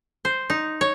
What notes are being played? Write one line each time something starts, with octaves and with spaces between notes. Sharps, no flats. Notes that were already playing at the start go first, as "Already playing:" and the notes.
C5
D#4
C#5